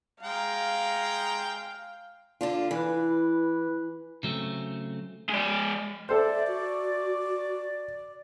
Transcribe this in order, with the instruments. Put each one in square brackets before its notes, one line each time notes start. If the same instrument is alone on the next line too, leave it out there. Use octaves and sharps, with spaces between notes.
[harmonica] G#3 G5 A#5 [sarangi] F5
[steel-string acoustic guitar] D3 D4 F4
[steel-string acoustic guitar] E3 [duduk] B4
[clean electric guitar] C#3 F#3 A3 C4
[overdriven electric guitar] G#3 D5
[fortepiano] A4 C5 [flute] D5 [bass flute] E5
[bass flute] F#4